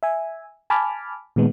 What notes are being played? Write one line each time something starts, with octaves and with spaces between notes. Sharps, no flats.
E5 G#5
G#5 A5 B5 D6 F6
A#2 D#3 G#3 B3